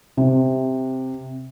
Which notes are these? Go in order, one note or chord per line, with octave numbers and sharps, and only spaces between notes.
C3